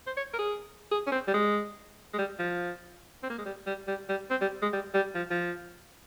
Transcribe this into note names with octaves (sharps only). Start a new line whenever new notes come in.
C5
C#5
A#4
G#4
G#4
C#4
C4
G3
G#3
G#3
G3
F3
C4
A#3
G#3
G3
G3
G3
G3
C4
G3
G#3
G3
G3
F3
F3